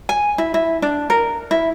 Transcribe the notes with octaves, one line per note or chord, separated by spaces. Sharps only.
G#5
E4
E4
D4
A#4
E4